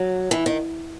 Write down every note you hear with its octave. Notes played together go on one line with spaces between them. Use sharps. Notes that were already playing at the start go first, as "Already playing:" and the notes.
Already playing: F#3
E3
D#3